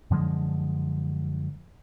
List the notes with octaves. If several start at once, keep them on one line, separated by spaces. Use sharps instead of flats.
F#2 D3 F3 G#3